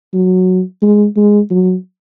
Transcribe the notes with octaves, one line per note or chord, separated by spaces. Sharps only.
F#3
G#3
G#3
F#3